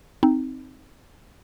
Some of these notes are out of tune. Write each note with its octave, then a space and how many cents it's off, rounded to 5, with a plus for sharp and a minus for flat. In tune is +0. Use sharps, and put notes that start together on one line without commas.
C4 +0 D#4 +0